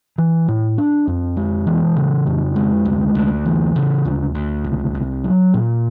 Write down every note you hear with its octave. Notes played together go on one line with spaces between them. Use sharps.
E3
A2
D4
F2
G#3
E3
C#3
F2
G#3
D2
D2
E3
C#3
D2
D2
C2
C2
F#3
A#2